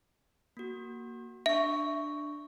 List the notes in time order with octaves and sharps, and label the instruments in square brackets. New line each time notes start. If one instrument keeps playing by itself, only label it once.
[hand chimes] A#3 F#4
[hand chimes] D4 C#6 [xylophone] E5